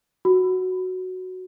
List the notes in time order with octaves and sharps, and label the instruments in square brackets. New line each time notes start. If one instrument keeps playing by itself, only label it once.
[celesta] F#4